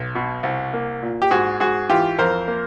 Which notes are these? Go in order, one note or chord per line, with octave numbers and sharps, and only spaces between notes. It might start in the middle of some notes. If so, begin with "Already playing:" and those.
Already playing: B1
B2
C2
A#3
A#2
G4
G#2 F#4 G#4
G#2 F#4 G#4
E3 F4 G4
F2 A#4 C5
A#3